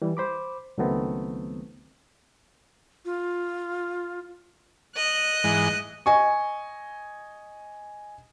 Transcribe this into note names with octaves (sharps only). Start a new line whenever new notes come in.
E3 G3
C5 B5 D6
C#2 D#3 F#3 A3 B3 C4
F4
D#5 F#6
G#2 E3 G#3
D#5 G#5 C#6